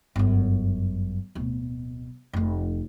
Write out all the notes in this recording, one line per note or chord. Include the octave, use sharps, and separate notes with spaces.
G1 F#2
D1 B2
F1 F2